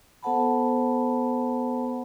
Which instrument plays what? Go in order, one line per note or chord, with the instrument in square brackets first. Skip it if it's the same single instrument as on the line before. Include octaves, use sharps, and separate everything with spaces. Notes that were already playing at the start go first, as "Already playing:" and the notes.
[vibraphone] B3 A4 C5 F#5 A5 B5